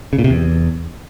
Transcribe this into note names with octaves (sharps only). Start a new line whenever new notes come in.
C#3
A#2
C3
E2